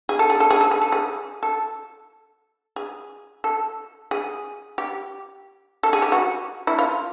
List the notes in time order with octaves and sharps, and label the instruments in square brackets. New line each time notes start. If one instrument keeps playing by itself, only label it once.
[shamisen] G#4
A4
G#4
A4
G#4
A4
G#4
A4
G#4
A4
G#4
A4
G#4
G4
A4
G#4
G4
F#4
E4
F4